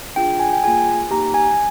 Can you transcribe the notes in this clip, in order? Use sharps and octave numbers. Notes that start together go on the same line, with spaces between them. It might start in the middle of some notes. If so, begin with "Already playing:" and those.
D4 F4 G#4 G5
G#5
G5
A#3 F4 G#4 G#5
A#3 D#4 G4 A#5
G#5